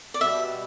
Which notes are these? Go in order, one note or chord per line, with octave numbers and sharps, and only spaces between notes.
D5
B2 G3 B3 E5